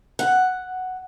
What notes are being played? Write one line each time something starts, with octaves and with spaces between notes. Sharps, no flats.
F#5